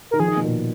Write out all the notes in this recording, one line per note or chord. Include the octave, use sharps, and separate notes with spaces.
D#3 A#4
F3 G#4
D#3
B2
A#2